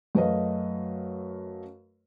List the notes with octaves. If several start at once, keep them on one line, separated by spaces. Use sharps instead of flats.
F#2 A3 B4 D#5 F5